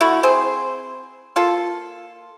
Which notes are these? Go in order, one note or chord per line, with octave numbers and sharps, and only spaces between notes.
D3 A3 E4 F#4
C4 G#4 C5
A#3 F4 A4